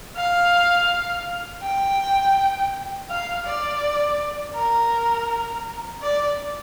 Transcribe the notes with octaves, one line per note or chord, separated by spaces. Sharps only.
F5
G5
F5
D5
A#4
D5